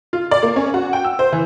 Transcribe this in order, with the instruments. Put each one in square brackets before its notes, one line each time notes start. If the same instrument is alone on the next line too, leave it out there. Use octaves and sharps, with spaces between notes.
[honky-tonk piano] F4
D5
A#3
C#4
F#4
G5
E6
C5
E3